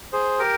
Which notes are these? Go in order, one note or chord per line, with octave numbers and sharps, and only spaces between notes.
G#4 C5
G4 A#4